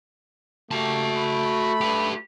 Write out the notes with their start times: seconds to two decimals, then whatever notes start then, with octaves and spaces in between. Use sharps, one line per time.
0.71 G3 A3 A#3 F#4 G4 A5
1.18 B5
1.81 G4 B4